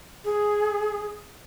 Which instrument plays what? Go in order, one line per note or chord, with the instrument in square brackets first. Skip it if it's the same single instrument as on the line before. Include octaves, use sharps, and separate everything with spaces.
[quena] G#4